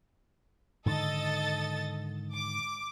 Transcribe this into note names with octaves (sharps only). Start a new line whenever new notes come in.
G#2 D3 D#3 A4 D#5 A6
D6